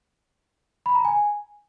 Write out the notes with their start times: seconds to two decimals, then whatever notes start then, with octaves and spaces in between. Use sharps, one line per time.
0.86 B5
0.95 A#5
1.05 G#5